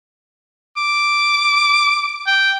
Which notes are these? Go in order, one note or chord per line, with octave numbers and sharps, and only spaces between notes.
D6
G5